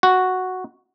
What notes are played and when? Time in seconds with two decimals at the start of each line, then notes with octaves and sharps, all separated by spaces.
0.03 F#4